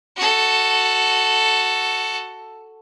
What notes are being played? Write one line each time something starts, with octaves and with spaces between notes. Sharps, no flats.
F#4 A4